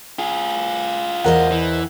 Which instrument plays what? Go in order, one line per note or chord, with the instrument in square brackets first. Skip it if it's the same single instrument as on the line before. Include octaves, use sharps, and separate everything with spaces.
[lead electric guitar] F4 G#4
[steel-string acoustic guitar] E2 C5 D#5 [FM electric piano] A#4 F#5
[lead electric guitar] E3